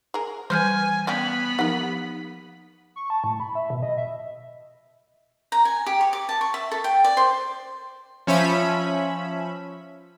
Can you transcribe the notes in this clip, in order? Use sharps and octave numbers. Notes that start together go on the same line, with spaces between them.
G#4 A#4
E3 G3 B4 C5 G#5 F6 G6
B3 C#4 D4 G4 F5 B5
F3 A#3 D#4 G4 F#5
C#6
A5
A2
B5
E5
B2
D#5
E5
A#5
G#5
G4
C#5
D6
A5
C#6
E5
A4
G5
D5
C5
F3 C#4 E5 B5